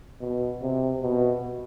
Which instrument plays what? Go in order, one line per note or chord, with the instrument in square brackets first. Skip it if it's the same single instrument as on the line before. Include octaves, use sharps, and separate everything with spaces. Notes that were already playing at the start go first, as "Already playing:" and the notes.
[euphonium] B2
C3
B2